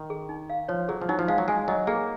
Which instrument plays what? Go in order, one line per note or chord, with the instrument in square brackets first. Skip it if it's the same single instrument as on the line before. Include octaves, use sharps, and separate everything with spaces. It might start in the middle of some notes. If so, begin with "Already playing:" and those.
Already playing: [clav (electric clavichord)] D#3
[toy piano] G#4
D#4
F5
[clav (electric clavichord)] F3 [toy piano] C#5
[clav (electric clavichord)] F#3 [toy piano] G#4
[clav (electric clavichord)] F3
[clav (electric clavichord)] F#3 [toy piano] D#4
[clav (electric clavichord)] F3
[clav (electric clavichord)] G#3 [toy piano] F5
[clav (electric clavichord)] F#3
[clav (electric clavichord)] G#3 [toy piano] G#5
[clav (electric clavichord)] F#3 [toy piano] D#5
[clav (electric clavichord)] A#3 [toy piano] G#4